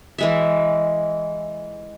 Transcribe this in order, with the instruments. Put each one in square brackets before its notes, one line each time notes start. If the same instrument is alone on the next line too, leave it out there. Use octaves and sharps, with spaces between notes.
[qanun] E3 G#3 E5